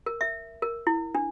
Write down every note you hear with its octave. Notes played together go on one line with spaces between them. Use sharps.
A#4
E5
A#4
E4
D4